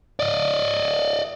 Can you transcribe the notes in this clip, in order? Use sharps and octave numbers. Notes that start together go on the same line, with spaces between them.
D5 D#5